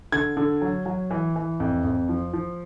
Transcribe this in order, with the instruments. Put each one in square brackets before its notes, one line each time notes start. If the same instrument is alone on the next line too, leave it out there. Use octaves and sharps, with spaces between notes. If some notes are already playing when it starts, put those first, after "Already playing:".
[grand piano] D3 G#6
D3
F#3
F#3
E3
E3
F2
F2
F3
F3